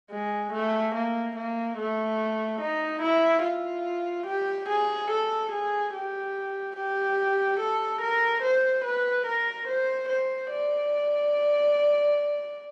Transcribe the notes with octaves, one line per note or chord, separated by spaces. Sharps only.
G#3
A3
A#3
A#3
A3
D#4
E4
F4
G4
G#4
A4
G#4
G4
G4
A4
A#4
C5
B4
A#4
C5
C5
D5